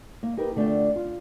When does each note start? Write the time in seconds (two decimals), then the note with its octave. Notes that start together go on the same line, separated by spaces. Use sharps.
0.23 A#3
0.37 D#4 G4 A#4 B4
0.56 D3 A3 D4 F4 F#5 G5
0.96 F4